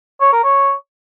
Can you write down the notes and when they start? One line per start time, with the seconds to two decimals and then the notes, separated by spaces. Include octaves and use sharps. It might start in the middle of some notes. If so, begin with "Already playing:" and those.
0.21 C#5
0.33 A#4
0.44 C#5